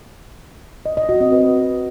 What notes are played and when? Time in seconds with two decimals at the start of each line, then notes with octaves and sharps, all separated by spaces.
0.86 D#5
0.97 D#5
1.09 F#4
1.20 C4
1.32 B4